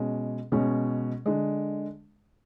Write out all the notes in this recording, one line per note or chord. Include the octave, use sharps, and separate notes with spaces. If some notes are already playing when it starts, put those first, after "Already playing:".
Already playing: B2 G#3 C#4
B2 G#3 C#4
D3 G#3